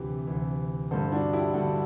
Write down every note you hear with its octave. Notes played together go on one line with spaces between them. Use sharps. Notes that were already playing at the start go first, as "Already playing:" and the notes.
Already playing: D2 C3 E3 G4 B4
D2 C3 E3
G2 D3 A4 C5
D4 F#4
E4 G4
G2 D3 F#4 A4